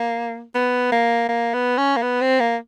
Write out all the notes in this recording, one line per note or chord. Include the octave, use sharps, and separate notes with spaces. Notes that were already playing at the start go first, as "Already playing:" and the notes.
Already playing: A#3
B3
A#3
A#3
B3
C#4
A#3
B3
C4
A#3